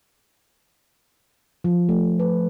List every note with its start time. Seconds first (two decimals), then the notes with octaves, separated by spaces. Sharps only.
1.64 F3
1.89 A3
2.20 B4